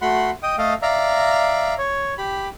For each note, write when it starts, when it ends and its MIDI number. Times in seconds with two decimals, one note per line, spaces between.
0.02 0.31 57
0.02 0.31 66
0.02 0.31 78
0.02 0.31 83
0.02 0.31 84
0.43 0.56 75
0.43 0.56 79
0.43 0.56 87
0.58 0.74 57
0.58 0.74 69
0.58 0.74 75
0.58 0.74 77
0.82 1.74 74
0.82 1.74 76
0.82 1.74 77
0.82 1.74 82
1.78 2.14 73
2.18 2.49 67
2.18 2.49 83